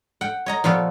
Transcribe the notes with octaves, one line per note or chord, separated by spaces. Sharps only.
F#5 G5
C#5 D#5 A#5
A#2 F3 B3 G4 A4